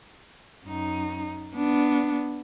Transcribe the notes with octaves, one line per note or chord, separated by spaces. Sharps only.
F#2 D#4
B3 D4